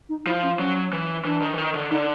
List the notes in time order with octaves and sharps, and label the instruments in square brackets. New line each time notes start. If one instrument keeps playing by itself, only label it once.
[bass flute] D#4
[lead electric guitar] F3 [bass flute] E4
[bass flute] C#4
[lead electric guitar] F#3 [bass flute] C#4
[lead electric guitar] E3
[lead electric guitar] E3 [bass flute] D4
[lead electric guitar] D#3
E3
D#3
D3
[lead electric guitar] D3 [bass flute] D#4